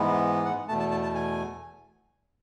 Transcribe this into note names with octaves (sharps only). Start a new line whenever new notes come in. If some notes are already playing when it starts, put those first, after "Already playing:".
Already playing: G#2 E3 G#3 B3
F#5
E2 B2 A3 A5
A5
A5
A5
G#5